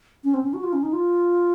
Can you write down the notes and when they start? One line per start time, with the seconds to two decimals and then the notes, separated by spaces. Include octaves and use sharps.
0.24 C#4
0.34 C4
0.43 C#4
0.54 F#4
0.63 F4
0.73 C#4
0.83 D#4
0.93 F4